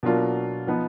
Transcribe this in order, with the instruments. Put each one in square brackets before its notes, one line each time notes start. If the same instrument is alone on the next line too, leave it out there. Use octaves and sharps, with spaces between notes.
[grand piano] B2 F#3 A#3 D4 F4
F3 B3 D#4